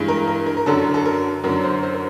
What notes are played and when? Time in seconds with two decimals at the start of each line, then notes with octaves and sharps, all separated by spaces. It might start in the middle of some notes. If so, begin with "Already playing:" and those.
Already playing: G2 E3 G#3
0.08 A#4
0.28 A#4
0.46 A#4
0.57 A#4
0.66 F#2 D3 F#3 A4
0.94 A4
1.05 A#4
1.44 F#2 D3 F#3 A#4
1.64 C5
1.83 C5
1.93 A#4